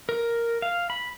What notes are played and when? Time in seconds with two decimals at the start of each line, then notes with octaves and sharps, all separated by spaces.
0.09 A#4
0.62 F5
0.90 B5